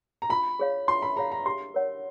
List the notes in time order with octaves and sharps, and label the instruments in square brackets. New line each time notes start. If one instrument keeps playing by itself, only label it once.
[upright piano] A#5
[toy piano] F4 [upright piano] B5
[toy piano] G#4 C#5 F5
[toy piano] F4 [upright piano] C6
[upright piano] B5
[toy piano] G#4 C#5 F5 [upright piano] A#5
[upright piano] A#5
[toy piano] G4 [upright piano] C6
[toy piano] A#4 C#5 F#5